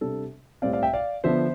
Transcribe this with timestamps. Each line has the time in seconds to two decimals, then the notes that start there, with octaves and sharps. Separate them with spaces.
0.01 C3 G3 D4 A4
0.62 A2 G3 C4 D5 F5
0.73 D5 F5
0.82 E5 G5
0.94 D5 F5
1.24 D3 F3 B3 D4 C5 E5